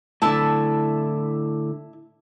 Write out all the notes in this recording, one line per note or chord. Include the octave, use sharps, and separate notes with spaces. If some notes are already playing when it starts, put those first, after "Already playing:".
A2 D3 E4 A5